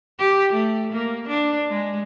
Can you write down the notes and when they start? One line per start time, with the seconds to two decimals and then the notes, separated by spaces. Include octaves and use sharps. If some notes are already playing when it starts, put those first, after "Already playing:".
0.19 G4
0.53 A3
0.93 A#3
1.28 D4
1.70 G#3